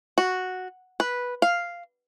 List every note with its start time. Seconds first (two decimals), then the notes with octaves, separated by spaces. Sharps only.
0.18 F#4
1.00 B4
1.42 F5